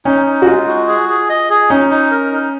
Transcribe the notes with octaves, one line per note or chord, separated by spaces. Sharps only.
C#4 D#4
D#4
F#4
G#3 F4
F#4
G#4
G#4
D#5
G#4
C#4 D#4
D#4
A#4
D#4